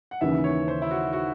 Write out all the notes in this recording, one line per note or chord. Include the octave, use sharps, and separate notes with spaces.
F#5
D#2 C#3 E3 E5
C#5
C5
E4
F#4
F#4